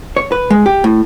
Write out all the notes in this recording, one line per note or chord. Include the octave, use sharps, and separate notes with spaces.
C#5
B4
G#3
G4
A2